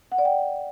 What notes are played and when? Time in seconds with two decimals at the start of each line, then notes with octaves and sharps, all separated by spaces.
0.12 F#5
0.18 D5
0.25 G5